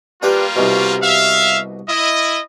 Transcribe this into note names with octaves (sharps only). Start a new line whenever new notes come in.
G3 A#3 D4 F4 G4 B4
C2 B2
E5 F5
E4 D#5